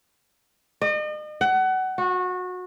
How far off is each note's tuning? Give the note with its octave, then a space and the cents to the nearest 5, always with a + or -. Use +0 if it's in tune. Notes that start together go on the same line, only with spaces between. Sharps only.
D#5 -40
F#5 +25
F#4 -25